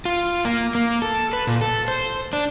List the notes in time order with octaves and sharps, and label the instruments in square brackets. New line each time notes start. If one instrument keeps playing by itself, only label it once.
[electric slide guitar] F4
A#3
A#3
A4
B4
A#2
A4
C5
D4